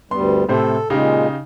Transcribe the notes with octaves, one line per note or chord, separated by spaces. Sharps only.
D2 G2 G3 B3 C6
A2 C3 A4 C5
A#2 C#3 G#3 D#4 G4